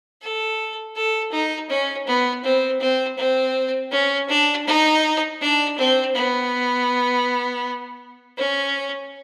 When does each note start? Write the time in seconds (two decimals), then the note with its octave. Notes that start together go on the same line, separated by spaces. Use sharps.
0.22 A4
0.96 A4
1.32 D#4
1.70 C#4
2.07 B3
2.44 C4
2.80 C4
3.17 C4
3.92 C#4
4.29 D4
4.66 D#4
5.41 D4
5.78 C4
6.15 B3
8.38 C#4